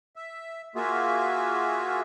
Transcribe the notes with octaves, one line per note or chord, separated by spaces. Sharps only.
E5
A#3 F4 F#4 G#4 E5